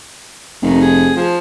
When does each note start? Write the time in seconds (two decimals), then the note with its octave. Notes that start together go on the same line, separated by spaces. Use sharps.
0.62 F1 D#3
0.81 G#4
1.16 F3